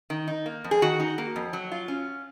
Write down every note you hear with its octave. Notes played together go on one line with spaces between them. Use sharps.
D#3
D#4
A#3
F2
G#4
D#3 F#4
D#4
A#3
F2
F#3
F4
C#4